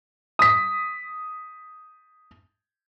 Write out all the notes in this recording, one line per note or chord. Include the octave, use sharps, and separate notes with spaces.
D#6 B6